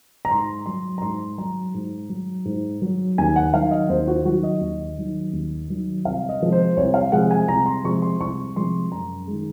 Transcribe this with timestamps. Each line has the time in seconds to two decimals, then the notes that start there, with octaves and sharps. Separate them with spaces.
0.25 A#5
0.31 G#2 C6
0.66 F#3 C6
0.98 A#5
1.02 G#2 C6
1.38 F#3 A#5
1.74 G#2
2.09 F#3
2.45 G#2
2.82 F#3
3.18 D#2 G#5
3.36 F#5
3.53 D#3 F#3 F5
3.71 D#5
3.89 D#2 C5
4.07 F#4
4.25 D#3 F#3 F#4
4.43 D#5
4.61 D#2
4.98 D#3 F#3
5.33 D#2
5.68 D#3 F#3
6.05 C2 F5
6.29 D#5
6.40 C3 F3 G#3
6.52 C5
6.77 C2 C#5
6.94 F5
7.12 C3 F3 G#3 F#5
7.31 G#5
7.48 C2 A#5
7.66 C6
7.84 C3 F3 G#3 C#6
8.02 C6
8.20 C2 C#6
8.56 C3 F3 G#3 C6
8.92 F#2 A#5
9.27 D#3 G#3